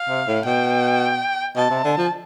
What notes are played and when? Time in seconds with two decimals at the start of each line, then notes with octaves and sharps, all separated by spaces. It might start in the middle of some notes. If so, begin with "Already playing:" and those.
Already playing: F5
0.09 C3
0.28 A2
0.45 B2 G5
1.56 B2 A5
1.70 C3
1.85 D3
1.98 F3